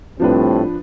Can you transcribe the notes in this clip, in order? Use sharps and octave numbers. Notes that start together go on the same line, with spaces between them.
A2 F3 G3 C4 D4 B4